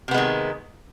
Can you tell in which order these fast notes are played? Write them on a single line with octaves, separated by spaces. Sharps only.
C3 B3 G#3 D#3